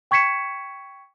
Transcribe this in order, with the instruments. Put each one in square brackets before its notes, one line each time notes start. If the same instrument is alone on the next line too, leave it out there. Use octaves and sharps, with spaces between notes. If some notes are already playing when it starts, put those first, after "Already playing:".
[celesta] G5 C#6 G#6 B6 C#7 E7